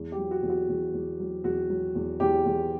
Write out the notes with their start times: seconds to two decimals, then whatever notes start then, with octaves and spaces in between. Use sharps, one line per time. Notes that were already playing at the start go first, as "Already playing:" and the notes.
Already playing: E2
0.12 G4
0.17 F#3
0.31 F#4
0.43 E2
0.49 F#4
0.69 E2
0.94 E2
1.20 F#3
1.44 E2 F#4
1.70 F#3
1.95 E2
2.20 E2 G4
2.46 E2